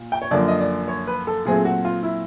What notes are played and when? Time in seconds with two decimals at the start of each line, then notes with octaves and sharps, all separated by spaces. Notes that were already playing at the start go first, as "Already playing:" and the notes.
Already playing: A#2
0.12 G5
0.22 C#5
0.31 F#2 D3 F3 A#3 D5
0.48 D#5
0.60 D5
0.88 C#5
1.08 B4
1.27 A4
1.45 A#2 F#3 A3 C4 G#4
1.65 F#4
1.85 F4
2.03 E4